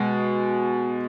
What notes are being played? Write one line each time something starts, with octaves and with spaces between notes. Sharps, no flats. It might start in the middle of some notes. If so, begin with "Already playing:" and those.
Already playing: B2 G#3